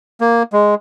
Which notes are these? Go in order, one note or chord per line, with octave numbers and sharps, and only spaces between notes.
A#3
G#3